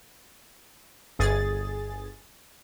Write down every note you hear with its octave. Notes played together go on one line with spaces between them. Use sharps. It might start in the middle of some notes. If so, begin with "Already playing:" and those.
G1 G#4 A6